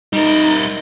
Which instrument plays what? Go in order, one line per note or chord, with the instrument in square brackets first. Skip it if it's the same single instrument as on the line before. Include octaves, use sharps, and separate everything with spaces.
[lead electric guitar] G3 A#4 [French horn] D#4